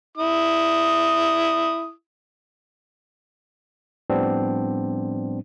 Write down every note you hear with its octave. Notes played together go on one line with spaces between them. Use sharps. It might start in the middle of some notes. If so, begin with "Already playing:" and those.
E4 D#6
A2 F3 G3 B3 C4 D4